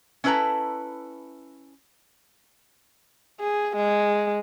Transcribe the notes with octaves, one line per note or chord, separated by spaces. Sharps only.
C#4 E4 A4 B4 A5 A#5
G#4
G#3